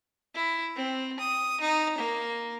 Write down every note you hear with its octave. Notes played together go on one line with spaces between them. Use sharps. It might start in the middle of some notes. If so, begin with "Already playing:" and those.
E4
C4
D#6
D#4
A#3